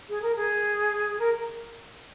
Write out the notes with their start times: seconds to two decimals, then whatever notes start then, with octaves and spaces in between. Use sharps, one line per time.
0.09 G#4
0.22 A#4
0.36 G#4
1.19 A#4